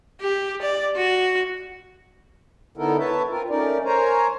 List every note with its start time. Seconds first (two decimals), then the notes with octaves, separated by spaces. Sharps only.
0.21 G4
0.62 D5
0.96 F#4
2.77 D3 B3 D#4 E4 A4 A#4
2.99 B4 C#5 E5 A5
3.30 C4 F4 A#4
3.50 A3 C#4 D#4 A#4 D5
3.85 A#4 C5 C#5 G#5 A#5